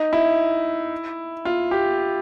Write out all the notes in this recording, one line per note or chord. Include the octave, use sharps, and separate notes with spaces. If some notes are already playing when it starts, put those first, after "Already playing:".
Already playing: D#4
E4
F4
G4